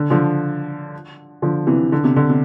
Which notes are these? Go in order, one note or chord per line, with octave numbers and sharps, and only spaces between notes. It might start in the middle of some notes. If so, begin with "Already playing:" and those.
Already playing: D3
D3 F3
D3 F3
C3 E3
D3
C3
D3
C3